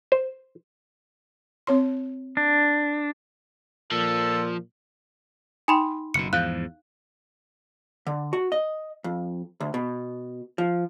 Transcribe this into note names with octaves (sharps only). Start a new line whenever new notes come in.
C5
C4 C#5 C6
D4
A#2 F3 A4
D#4 G5 G#5 B5 C6
F#1 B2 C#7
E2 G#2 F3 F5 F#6 G6
D3
F#4
D#5
F2
D2
B2
F3